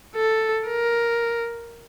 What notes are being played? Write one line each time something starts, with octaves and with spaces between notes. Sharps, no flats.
A4
A#4